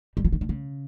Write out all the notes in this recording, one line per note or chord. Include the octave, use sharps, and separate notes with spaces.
G3
F3
D#3
D3
C#3